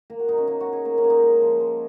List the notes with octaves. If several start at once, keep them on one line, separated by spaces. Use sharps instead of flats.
A#3 A#4
F#4
B2 D#4
C#4
A#3 D#4
F#4
B2
G#4
A#3 A#4
C#4
A#3
D#4
G#3
F3
G#3